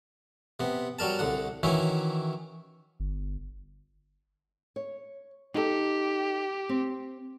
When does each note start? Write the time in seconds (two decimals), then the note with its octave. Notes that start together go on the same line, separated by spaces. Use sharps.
0.60 C3 B3
0.99 F#3 G3 A#4 A5
1.19 C2 D3 F#5
1.63 D#3 E3 F#3 C#4 E4
3.00 G1
4.76 C#5
5.54 D#4 G4 A4
6.69 C4